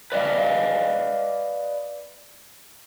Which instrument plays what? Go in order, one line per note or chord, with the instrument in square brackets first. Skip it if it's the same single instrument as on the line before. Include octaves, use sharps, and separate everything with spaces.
[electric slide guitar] B4 D5 D#5 F5